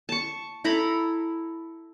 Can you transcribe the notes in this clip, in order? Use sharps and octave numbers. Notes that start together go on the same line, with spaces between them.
A5 C#6
E4 A4 A#5 B5